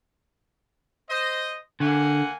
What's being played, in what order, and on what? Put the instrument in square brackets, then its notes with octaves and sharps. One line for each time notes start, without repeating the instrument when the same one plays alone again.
[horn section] C5 D#5
[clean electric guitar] D3 [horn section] A#3 F#5 G#5